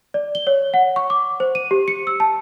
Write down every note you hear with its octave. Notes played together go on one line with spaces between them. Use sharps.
D5
G7
C#5
F#5
C#6
D6
C5
D#7
G4
C#7
E6
A5